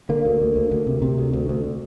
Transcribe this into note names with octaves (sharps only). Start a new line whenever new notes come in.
D3 A#3
D2
D2
D2
D2
C3
C3
D2
D2
D2